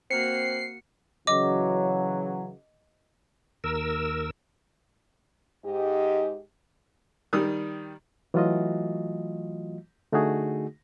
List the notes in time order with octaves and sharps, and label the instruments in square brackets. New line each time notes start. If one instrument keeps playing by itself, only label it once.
[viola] A#3 F#4 [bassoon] C4 [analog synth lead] C7 [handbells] C#7
[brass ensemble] C#3 E3 F#3 [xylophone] D#5 D6
[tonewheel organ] D#2 A#4 E6
[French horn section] G#2 G4 D#5
[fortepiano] D#3 G3 D#6
[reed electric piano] E3 F#3 A3 F4 F#4 D#5
D3 A3 D#4 F#4 G#4